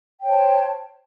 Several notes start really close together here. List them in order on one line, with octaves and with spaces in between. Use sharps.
G5 C#5 C5 A5